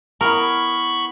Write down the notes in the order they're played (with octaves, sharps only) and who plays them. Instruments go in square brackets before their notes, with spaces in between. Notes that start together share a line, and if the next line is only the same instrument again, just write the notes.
[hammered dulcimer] B3 E4 [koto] A#4 [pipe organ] B5 C#6